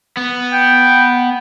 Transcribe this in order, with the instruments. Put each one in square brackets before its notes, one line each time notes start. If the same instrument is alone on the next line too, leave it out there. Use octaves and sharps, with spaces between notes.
[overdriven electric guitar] B3
[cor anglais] G5